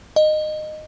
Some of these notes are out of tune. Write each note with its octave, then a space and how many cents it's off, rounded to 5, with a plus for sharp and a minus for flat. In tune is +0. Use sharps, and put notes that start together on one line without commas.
D#5 -15